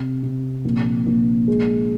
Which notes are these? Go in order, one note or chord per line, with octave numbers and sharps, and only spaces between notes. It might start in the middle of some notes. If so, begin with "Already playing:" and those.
Already playing: C3
C3
A#1
A#1
G#3